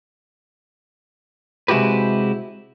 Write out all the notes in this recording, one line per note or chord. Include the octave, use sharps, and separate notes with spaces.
C3 G#3 E4 F#4 G4 B4